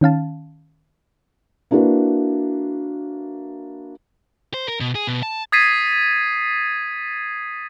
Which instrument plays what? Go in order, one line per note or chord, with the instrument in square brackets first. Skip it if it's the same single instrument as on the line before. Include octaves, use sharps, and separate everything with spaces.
[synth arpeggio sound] D#3 C#4 F5 A5
[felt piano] A#3 D4 E4 F#4 B4
[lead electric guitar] C5
A#4
B2
G#4
B2
A5
[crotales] D#6 G#6 A6 B6 C7 D#7